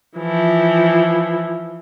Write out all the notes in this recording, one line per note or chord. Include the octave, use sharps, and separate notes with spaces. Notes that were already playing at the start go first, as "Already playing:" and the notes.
E3 F3